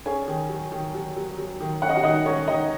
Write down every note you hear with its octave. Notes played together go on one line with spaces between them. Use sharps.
C#4 G#4 G#5
D#3
F#3
D#3
F#3
F#3
F#3
D#3
C#4 F#5
D#5
F#4 F#5
D#3 D#4 D#5
C#4 C#5
D#3 D#4 D#5